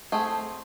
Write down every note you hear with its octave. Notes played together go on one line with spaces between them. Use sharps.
A3 C4 G#4